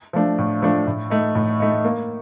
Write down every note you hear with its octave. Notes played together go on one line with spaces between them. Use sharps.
F3 A3 D4
A2
F3 A3 D4
A2
A3 D#4
A2
A3 D#4
A#3